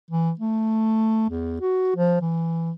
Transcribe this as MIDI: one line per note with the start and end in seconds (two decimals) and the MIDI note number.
0.11 0.31 52
0.39 1.24 57
1.29 1.61 40
1.61 1.94 66
1.96 2.17 53
2.21 2.71 52